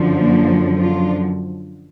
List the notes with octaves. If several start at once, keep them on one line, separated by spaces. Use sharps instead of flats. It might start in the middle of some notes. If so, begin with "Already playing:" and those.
Already playing: F#2 D3 F3
A#3 D4
D4 F4